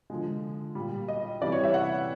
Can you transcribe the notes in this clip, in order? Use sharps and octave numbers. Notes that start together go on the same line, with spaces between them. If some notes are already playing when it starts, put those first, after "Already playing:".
D3 F3 G#3
A#2 G3
D#5
C3 E3 G3 D5
C#5
E5
F#5